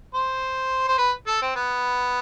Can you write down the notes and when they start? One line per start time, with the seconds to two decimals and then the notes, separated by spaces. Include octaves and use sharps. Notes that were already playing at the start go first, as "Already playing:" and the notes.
0.14 C5
0.88 C5
0.98 B4
1.27 A4
1.42 C4
1.56 B3